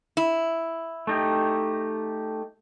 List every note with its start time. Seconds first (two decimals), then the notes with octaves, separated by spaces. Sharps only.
0.17 E4
1.07 A3 D#4 G4